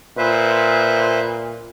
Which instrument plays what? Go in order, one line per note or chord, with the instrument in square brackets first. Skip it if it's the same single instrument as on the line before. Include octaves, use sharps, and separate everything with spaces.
[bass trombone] A#2 [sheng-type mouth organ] B4 C5 E5